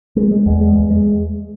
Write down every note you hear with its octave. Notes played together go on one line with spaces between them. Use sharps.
G#3
G#3
E2
G#3
E2
G#3